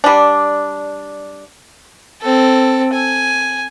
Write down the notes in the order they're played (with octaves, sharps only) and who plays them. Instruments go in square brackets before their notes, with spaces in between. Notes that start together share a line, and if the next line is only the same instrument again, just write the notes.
[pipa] G3 D4
[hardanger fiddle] C4 A4
G#5